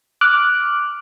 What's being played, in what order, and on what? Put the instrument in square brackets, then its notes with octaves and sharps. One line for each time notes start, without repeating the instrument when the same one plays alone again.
[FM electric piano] D6 F6 F#6